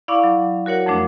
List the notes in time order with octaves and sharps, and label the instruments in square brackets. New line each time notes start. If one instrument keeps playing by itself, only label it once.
[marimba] E4 D5 F5 B5 C#6 D6
F#3
F#4 A#4 C#5 F#5
F2 F3 A3 D4